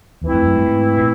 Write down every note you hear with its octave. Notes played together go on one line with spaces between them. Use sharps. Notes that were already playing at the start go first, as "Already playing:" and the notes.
E2 E3 A3 C4 E4
F2
F#2
G2
G#2
A#2